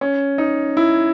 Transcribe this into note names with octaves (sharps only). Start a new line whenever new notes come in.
C#4
D#4
E4